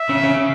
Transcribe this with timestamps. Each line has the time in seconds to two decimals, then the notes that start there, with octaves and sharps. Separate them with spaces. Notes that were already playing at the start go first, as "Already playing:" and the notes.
Already playing: E5
0.10 C#3
0.24 C#3